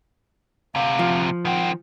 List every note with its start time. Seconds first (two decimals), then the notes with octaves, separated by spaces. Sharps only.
0.75 D2 C3 F5
0.99 F3
1.45 D#3 C4 F#5